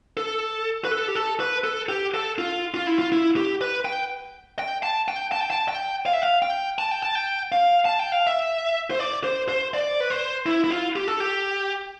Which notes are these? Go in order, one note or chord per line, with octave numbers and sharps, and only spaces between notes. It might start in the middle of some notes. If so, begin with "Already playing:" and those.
A4
B4
A4
G4
A4
B4
A4
G4
A4
F4
F4
E4
F4
E4
G4
B4
G5
G5
A5
G5
A5
G5
A5
G5
F5
E5
F5
G5
A5
G5
A5
G5
F5
A5
G5
F5
E5
C5
D5
C5
C5
D5
B4
C5
E4
E4
F4
G4
A4
G4